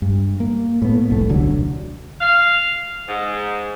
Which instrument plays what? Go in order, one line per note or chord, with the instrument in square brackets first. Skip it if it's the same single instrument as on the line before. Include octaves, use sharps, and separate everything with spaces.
[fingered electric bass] G2
A#3
A2 B3
F1 C2 A3
D#1 C2 D3 F#3
[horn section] F5
G#2